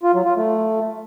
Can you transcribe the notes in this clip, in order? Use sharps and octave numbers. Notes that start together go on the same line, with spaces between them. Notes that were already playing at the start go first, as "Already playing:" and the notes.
F4
F#3
F4
A3